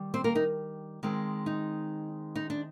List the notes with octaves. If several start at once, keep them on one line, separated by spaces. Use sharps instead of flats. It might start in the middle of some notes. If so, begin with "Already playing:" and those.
Already playing: D#3 G3
C4 C5
A#3 A#4
D#4
D#3 G#3 C4
D#4
D#4
D4